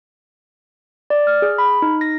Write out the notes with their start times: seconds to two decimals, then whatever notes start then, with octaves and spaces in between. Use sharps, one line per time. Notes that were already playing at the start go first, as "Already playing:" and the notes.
1.10 D5
1.27 F6
1.42 G#4
1.58 B5
1.82 D#4
2.01 A#6